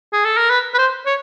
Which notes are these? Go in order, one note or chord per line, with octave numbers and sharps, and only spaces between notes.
G#4
A4
A#4
B4
B4
C5
C#5